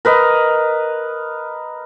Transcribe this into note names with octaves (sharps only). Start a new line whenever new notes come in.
A#4 B4 D#5